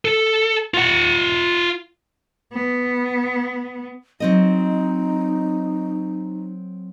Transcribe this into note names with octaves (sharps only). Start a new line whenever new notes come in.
A4
F4 F#5
B3
F#3 C4 D#4 D#5